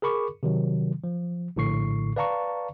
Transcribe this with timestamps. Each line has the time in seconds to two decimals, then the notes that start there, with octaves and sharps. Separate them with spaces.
0.02 G#4 A#4 B5 C#6 D6
0.43 C3 D#3 F#3
1.04 F3
1.56 A#1 A2 D3 C#6 C7
2.16 B4 D5 F5 A5 A#5 C#6